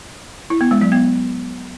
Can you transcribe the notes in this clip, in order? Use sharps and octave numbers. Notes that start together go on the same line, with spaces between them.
E4
B3
G#3
F#3
B3